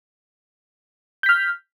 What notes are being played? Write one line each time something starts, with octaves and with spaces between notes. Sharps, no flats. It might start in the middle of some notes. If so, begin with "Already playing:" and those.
F6 G6 B6